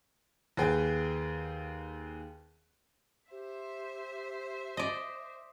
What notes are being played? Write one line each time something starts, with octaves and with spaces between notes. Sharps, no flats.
D#2 G#4 B4 G5
G4 C5 E5
D5 D#5